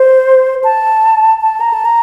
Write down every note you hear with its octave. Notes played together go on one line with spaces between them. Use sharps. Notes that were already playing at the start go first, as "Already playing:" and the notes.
Already playing: C5
A5
A5
A#5
A5
A#5